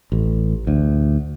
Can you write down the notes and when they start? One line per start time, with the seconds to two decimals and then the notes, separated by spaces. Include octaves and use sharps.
0.12 A1
0.67 D2